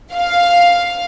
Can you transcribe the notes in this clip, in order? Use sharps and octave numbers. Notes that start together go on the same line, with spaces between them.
F5